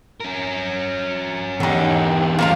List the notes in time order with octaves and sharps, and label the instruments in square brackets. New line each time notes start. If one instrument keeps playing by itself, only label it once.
[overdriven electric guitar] C#4 A#4
[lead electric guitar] E2 G4 [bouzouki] D3 D#4
[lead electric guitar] E2 C#4 [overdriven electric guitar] A3 E4 [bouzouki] A#3 F4 A#5